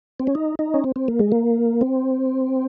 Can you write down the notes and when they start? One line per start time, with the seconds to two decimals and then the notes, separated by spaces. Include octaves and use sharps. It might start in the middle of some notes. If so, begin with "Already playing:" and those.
0.20 C4
0.27 C#4
0.35 D#4
0.59 D#4
0.74 C#4
0.84 C4
0.96 C4
1.08 A#3
1.19 G#3
1.32 A#3
1.81 C4